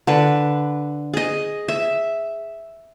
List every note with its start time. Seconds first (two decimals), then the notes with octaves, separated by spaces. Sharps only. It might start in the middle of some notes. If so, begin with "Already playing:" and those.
0.07 D3 B4
1.13 G#4 D#5
1.68 E5